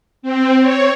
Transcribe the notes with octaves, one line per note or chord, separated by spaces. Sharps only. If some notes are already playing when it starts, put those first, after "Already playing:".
C4
C#5